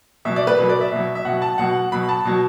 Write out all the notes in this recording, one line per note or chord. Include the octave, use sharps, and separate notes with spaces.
B2 F#3 E5
D5
B4
B2 F#3 B4
D5
E5
B2 F#3
E5
B2 F#3 F#5
A5
B2 F#3 F#5
B2 F#3 B5
A5
B2 F#3